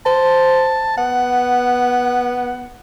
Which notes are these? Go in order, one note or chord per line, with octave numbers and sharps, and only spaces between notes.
C5 A5
B3 F#5